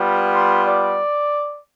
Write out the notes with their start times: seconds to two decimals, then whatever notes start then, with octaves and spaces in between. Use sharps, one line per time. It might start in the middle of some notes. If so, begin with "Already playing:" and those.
Already playing: G3 B3 F4
0.35 C6
0.65 D5